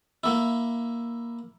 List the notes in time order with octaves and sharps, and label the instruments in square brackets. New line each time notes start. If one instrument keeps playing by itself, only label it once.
[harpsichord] A#3 E4